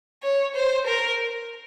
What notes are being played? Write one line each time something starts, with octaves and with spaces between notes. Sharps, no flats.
C#5
C5
A#4